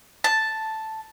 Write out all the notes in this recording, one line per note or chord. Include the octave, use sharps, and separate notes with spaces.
A5